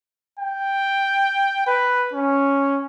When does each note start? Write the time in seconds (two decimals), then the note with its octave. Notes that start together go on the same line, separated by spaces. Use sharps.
0.39 G5
1.67 B4
2.13 C#4